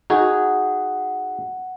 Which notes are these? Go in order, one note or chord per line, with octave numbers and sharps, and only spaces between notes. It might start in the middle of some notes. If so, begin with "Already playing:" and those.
D#4 F#4 G#4 F#5